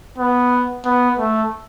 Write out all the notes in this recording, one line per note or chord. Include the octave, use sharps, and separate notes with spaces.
B3
B3
A3